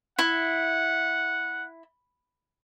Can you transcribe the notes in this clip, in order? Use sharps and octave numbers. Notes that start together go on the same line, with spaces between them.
E4 F#5